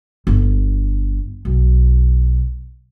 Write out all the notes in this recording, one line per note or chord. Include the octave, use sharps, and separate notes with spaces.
G1
B1